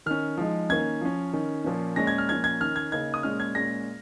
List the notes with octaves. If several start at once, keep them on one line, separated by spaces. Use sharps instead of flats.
D#3 C#4 F6
F3 G#3 D#4
D#3 A#3 C#4 G#6
F3 C#4
D#3 C#4
A#2 F3 A#3 C#4
A#2 G#3 C#4 A#6
G#6
F6
A#2 F3 C#4 G#6
G#6
D#3 C#4 F6
G#6
C#3 A#3 D#4 G#6
D#6
A#2 G#3 C#4 F6
G#6
A#2 G#3 C#4 A#6